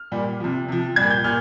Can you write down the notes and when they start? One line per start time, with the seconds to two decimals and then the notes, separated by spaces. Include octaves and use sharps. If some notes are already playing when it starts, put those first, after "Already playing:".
Already playing: F6
0.12 A#2 G3
0.40 C3 F3
0.68 C3 F3
0.96 A#2 G3 G#6
1.10 G6
1.24 A#2 F6